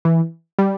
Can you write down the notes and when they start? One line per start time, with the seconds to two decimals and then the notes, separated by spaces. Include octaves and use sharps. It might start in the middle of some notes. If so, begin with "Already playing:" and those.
0.05 E3
0.59 G3